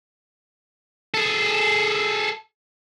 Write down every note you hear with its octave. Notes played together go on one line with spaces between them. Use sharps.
G#4 A4